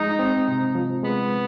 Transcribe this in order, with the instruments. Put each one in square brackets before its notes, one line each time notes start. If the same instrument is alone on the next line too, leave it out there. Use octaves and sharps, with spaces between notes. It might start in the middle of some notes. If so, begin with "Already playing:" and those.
Already playing: [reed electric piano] F3 G#3 [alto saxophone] D#4
[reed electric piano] C4
C3
F3
[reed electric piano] G#3 [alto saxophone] B3